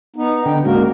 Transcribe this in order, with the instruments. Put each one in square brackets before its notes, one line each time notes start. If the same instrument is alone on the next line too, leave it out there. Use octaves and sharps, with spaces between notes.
[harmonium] B3 D#4
[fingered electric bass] D3 [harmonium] G5
[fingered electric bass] C#2 G#2 C#3 [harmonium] A#3 F#4 A#4